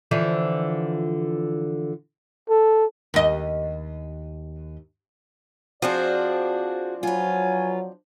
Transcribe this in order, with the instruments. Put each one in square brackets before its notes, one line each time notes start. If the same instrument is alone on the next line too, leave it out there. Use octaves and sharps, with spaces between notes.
[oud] D3 E3 F3
[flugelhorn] A4
[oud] D#2 D#5
[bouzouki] F3 C4 D4 [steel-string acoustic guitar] F#4 G#4 [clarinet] D5
[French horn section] F#3 [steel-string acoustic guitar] F4 B4 [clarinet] G#5